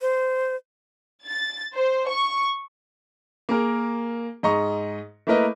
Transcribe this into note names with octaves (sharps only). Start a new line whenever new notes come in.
C5
A6
C5
C#6
A#3 G#4 A#4
G#2 D#5 A#5 C#6
A3 A#3 E4 A#4 B4 D#5